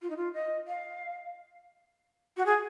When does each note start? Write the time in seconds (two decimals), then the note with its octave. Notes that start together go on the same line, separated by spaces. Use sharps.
0.02 F4
0.10 D#4
0.16 F4
0.34 D#5
0.67 F5
2.37 F#4
2.45 G#4